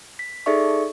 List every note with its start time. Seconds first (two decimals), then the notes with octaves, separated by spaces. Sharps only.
0.19 B6
0.46 D#4 G#4 A4 D5 E5 C#6